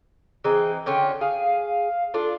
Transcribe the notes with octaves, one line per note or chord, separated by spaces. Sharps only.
E3 C4 D#4 G#4
D3 C#4 F4 G5
G#4 F5
D4 F4 A4